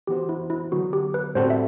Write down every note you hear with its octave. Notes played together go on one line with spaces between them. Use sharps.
E3 B3 F#4 G4 C5
E4
E4
D3 F#3 B3 F#4
G4
B4
A2 G3 C4 F#4 A4 C5
E5